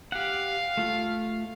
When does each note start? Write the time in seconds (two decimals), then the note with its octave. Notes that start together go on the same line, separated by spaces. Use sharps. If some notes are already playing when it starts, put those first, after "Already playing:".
0.12 G4 F5 F#5
0.77 A3 F4